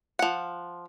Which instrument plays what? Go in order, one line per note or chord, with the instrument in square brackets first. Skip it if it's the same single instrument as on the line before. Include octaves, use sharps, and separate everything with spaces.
[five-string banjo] F3 F#5